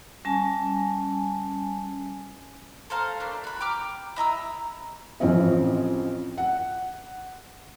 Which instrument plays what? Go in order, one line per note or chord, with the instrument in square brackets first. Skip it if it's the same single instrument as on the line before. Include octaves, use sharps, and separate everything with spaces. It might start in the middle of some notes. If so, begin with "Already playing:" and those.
[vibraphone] G3 C#4 G#5 A5
[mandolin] A4 C5 F5 A#5
A3 A#3 D4
F#4 B5
G5 A#5 D6 F6
E4 D#5 A#5 E6
[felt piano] A1 F3 C4 C#4 D#5
F#5